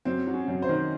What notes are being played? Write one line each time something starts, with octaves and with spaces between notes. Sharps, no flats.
F#2 C4
F#3
C#4
F#2
C5
D#3